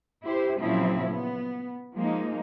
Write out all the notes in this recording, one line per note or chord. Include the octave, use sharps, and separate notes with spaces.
E4 G4 C5
A#2 C#3 F3 F#3 C4 E4
B3
F3 G#3 A#3 D#4